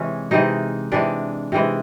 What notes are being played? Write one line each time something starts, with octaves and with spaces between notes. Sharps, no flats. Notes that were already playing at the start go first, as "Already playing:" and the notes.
Already playing: C3 E3 G#3 C#4
C3 E3 G#3 D#4
C3 E3 G#3 D4
C3 E3 G#3